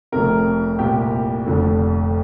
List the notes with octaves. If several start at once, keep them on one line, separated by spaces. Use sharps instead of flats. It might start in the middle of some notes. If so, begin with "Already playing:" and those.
F1 F2 C3 A#4
C2 A#2 G4
F1 F2 D3